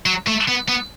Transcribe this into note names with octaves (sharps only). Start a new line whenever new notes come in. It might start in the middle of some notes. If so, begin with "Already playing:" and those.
F#3
A3
B3
B3